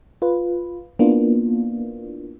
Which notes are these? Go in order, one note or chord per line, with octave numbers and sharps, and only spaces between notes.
F4 B4
A#3 B3 D4 E4 F4